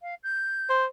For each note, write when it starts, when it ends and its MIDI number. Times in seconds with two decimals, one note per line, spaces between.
0.01 0.15 77
0.23 0.71 91
0.70 0.85 72